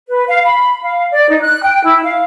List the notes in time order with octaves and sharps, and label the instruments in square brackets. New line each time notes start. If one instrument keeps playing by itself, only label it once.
[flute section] B4
F5
B5
F5
D5
D#4
F#6
G5
E4
F5